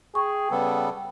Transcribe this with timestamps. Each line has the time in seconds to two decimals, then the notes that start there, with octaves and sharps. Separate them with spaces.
0.15 G#4 G5 C#6
0.51 C#3 G3 B3 A4